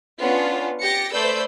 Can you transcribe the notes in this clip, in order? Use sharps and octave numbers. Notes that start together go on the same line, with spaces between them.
B3 C#4 D4 F4
G4 A6 A#6 C#7
A3 B4 C5 D5 E6 G6